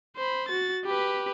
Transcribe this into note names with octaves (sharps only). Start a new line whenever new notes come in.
C5 B5
F#4 A6
G4 B4